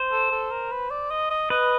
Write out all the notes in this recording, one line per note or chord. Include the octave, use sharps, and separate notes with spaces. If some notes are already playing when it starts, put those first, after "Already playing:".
Already playing: C5
A4
A4
A#4
B4
D5
D#5
D#5
B4 D#5